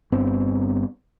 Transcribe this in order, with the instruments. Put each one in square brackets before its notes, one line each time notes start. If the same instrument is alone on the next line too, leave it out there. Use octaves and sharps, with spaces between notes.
[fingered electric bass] G1 G2 B3 C4